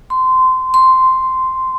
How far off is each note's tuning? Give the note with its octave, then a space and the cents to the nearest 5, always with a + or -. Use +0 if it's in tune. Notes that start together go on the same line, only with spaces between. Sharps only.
C6 -20
C6 -10